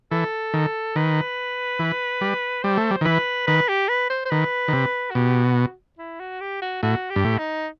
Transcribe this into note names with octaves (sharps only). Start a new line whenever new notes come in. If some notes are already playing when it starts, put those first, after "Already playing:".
E3 A4
D#3
D#3 B4
E3
G3
G3 C5
A3
G3
D#3
E3 B4
D#3 B4
G4
B4
C5
C5
D#3 B4
D#3
C3
F#4
B2 G4
F#4
E4
F#4
G4
F#4
A2 F#4
G4
G2
A2
D#4